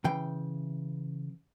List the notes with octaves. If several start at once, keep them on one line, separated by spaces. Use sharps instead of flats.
C#3 E3 G5